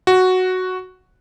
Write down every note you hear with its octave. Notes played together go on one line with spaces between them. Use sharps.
F#4